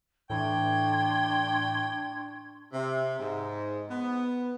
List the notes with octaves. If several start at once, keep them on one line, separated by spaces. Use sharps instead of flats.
A2 E3 D4 G5 C6 C#6 G#6
C3
G#2
B3